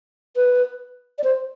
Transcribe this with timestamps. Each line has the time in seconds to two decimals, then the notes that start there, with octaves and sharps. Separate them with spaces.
0.36 B4
1.18 D5
1.24 C5